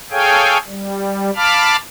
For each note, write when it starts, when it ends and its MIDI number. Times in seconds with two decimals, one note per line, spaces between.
0.11 0.58 68
0.11 0.58 69
0.11 0.58 73
0.11 0.58 77
0.11 0.58 79
0.11 0.58 80
0.67 1.30 55
1.36 1.76 77
1.36 1.76 81
1.36 1.76 83
1.36 1.76 86
1.36 1.76 89